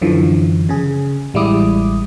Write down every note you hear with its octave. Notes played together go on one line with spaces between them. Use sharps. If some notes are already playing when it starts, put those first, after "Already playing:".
F#2 D3 E3 F3
C#3 G#4
A1 G3 G#3 E4 D6 D#6